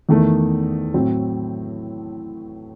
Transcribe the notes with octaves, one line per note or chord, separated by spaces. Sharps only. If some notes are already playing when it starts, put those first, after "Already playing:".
E2 D#3 A3
A2 F#3 C4